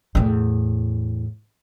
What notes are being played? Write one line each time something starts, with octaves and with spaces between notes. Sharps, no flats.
E2 A2